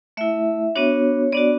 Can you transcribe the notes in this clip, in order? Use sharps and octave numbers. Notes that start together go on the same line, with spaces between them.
A3 E4 E5
B3 D4 F#4 C#5
B3 D4 F#4 D5